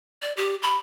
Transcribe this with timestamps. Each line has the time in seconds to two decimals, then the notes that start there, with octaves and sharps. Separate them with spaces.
0.22 D5
0.37 G4
0.62 B5